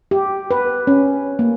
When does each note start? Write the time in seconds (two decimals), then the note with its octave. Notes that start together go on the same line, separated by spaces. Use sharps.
0.11 G4
0.51 B4
0.87 C#4
1.39 A#3